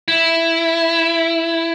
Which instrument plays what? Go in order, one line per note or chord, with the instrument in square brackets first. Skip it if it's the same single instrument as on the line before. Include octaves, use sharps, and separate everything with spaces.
[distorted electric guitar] E4